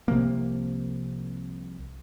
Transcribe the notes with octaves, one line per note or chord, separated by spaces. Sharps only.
C2 C3 F3 A#3